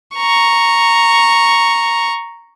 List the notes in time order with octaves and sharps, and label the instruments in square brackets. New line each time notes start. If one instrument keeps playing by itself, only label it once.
[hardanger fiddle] A#5 C#6